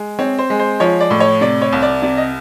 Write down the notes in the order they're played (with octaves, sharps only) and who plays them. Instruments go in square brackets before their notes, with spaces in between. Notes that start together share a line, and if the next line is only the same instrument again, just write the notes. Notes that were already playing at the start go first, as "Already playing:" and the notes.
Already playing: [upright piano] G#3
C4 C#5
C5
G#3
C5
F3 C#5
D5
A2
C#5
C3 D5
C#5
C2
D5
C3 D5
D#5